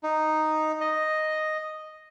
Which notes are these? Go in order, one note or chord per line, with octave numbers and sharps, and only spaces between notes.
D#4
D#5